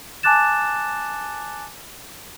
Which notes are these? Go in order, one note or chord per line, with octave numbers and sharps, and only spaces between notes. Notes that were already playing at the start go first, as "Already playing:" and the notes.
G#5 A5 D6 F#6 A6 E7